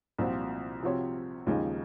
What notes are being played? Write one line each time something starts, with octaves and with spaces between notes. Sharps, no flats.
C2 A#2 F3 C4 F#4
C3 F3 C4 F#4 C#5
D#2 C#3 F3 G#3 D#4